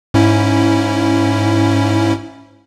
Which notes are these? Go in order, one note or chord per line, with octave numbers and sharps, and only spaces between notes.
G#2 C#4 E4